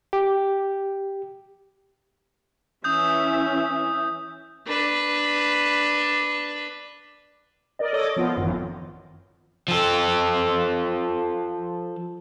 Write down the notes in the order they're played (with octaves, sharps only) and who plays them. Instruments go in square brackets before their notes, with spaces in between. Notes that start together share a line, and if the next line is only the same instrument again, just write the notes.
[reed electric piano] G4
[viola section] E3 C#4 E5 [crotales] D#6 G6
[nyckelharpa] D4 B4
[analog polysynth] A#4 D5 D#5
A4 C#5 D#5 D6
F3 B3 F4
G#1 F#2 D#3 E3
[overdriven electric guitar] F3 A4